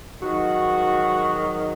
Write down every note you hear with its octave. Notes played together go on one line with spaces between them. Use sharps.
G#2 D#3 F#3 F#4